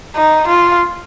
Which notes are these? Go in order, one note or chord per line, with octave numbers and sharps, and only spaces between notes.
D#4
F4